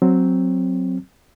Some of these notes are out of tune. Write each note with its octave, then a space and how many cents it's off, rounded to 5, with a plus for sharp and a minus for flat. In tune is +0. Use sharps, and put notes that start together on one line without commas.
F#3 +0 C4 +0